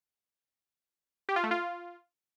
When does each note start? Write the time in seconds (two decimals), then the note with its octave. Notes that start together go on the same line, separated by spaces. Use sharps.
1.29 G4
1.36 F4
1.43 A3
1.51 F4